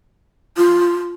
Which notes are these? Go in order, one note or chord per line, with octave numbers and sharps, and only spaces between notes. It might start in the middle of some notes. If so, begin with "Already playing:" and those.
F4